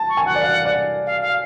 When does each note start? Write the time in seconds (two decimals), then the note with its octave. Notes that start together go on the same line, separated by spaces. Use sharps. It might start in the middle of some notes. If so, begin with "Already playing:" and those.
Already playing: A5
0.09 C#6
0.17 G#5
0.26 F#5
0.35 D5
0.42 F5
0.65 D5
1.06 F5
1.22 F5